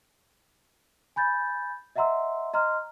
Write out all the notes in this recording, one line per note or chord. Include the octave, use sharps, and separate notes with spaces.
G#5 B5 G6 A6
D#5 E5 F#5 A#5 C6 E6
D#5 A#5 C6 F6